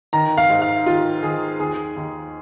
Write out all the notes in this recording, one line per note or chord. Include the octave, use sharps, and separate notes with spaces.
D#3 A#5
F5
G#2
F5
D#3 F4
D#3 G#4
D#2 G#4
D#2